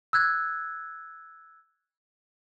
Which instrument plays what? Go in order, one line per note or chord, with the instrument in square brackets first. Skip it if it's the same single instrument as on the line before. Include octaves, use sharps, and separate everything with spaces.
[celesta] E6 F#6 G#6